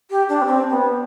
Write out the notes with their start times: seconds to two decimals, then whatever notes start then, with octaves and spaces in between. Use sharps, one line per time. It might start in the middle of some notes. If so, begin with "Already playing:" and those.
0.10 G4
0.29 D4
0.42 B3
0.46 C4
0.70 B3